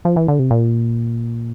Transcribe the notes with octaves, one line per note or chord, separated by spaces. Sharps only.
F3
E3
D3
C3
A#2